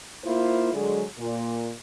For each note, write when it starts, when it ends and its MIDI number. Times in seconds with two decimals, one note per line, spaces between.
0.24 0.70 58
0.24 0.70 64
0.24 0.70 65
0.24 0.70 72
0.73 1.02 50
0.73 1.02 54
0.73 1.02 56
1.18 1.72 46